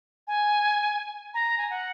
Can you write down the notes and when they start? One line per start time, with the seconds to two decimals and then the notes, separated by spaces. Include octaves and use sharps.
0.28 G#5
1.34 A#5
1.58 G#5
1.70 F#5